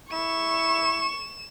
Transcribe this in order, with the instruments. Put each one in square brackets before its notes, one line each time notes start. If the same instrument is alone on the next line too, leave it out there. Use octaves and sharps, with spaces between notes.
[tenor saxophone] E4 [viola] C#6 [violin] E7